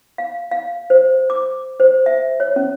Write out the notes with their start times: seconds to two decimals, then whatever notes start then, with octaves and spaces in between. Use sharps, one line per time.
0.18 F5
0.51 F5
0.90 C5
1.30 D6
1.80 C5
2.06 E5
2.40 C#5
2.56 C#4